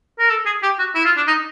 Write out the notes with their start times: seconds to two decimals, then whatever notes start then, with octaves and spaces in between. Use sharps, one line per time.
0.19 A#4
0.30 A4
0.46 G#4
0.63 G4
0.79 F#4
0.95 E4
1.05 F4
1.17 D4
1.27 D#4